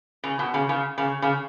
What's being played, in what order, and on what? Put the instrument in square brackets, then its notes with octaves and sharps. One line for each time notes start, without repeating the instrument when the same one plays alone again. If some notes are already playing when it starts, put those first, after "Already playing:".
[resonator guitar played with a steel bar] C#3
B2
C#3
C#3
C#3
C#3